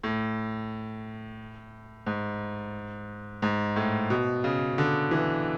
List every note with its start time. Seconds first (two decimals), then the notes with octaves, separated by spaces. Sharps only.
0.03 A2
2.07 G#2
3.42 G#2
3.76 A2
4.10 B2
4.44 C#3
4.78 D3
5.11 E3